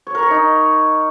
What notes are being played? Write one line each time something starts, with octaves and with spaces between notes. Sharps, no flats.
C#5
A#4
C#5
D#4